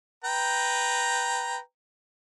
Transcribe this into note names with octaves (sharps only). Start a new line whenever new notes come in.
B4 G5 A#5